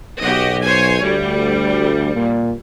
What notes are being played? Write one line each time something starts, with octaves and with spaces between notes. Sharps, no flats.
B1 F#4 G4 D#5
C5 C#5 G#5
D2 G3
A#2 A#3